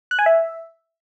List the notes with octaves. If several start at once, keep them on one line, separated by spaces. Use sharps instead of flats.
F#6
G#5
E5